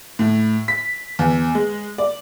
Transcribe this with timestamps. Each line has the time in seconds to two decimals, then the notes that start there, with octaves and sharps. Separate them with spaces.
0.19 A2
0.68 B6
1.19 E2
1.55 G#3
1.98 D5